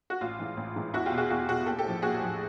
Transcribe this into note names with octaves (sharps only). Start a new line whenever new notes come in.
F#4
A1 F4
G#2 E3
A1
G#2 E3
E2 E4 F#4
F4 G4
B2
F#4 G#4
E2 F#4 G#4
B2 F#4 G#4
A#1 G4 A4
G4 A4
A2 F3
A#1 F#4 G#4
A2 F3